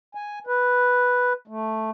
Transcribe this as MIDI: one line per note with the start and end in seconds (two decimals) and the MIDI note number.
0.15 0.39 80
0.47 1.33 71
1.48 1.91 57